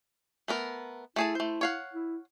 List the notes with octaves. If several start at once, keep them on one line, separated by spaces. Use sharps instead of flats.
A3 B3 A#4
A3 E4 G#4 A5
A3 C5
C#5 F5 F#5
E4